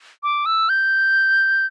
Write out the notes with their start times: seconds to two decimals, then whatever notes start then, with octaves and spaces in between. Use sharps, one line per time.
0.23 D6
0.46 E6
0.69 G6